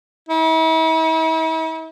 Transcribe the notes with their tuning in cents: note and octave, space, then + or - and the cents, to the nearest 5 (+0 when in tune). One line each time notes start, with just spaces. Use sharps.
E4 -45